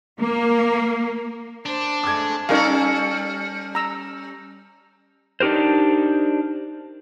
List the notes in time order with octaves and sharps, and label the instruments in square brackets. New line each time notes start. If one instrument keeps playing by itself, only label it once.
[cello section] A#3
[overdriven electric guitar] D4 [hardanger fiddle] C5
[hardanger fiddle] G#3 A3 [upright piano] D6 G#6
[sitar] G3 C#4 A4 [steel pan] D#4 A#4 F5
[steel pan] A#5 E6
[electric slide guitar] D4 D#4 G4 A#4 C5